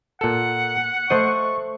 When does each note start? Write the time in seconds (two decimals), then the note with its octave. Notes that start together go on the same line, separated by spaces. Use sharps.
0.21 A#2 A4 F#5
1.10 A3 C5 D#5 C#6 C#7